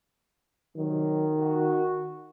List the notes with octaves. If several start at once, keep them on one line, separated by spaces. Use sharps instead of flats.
C3 D#3 F#3
F#4